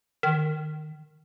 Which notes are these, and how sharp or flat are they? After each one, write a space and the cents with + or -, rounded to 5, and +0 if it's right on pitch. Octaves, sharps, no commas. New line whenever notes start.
D#3 -20